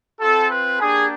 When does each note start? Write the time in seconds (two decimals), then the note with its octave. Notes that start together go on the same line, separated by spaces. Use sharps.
0.20 C4 F4 A4
0.50 B4
0.80 A#3 D4 G4 G#4